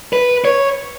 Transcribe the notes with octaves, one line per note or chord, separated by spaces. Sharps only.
B4
C#5